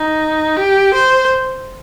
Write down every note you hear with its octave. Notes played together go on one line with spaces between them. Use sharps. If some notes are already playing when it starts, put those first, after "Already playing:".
Already playing: D#4
G4
C5